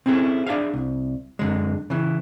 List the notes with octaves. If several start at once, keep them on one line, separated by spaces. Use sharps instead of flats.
C4 C#4 E4 G#4 A4
D4 G#4 E5 F5
C2
F#2 D3 G#3
C#3 E3